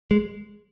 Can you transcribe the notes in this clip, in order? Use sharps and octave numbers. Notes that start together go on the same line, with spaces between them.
G#3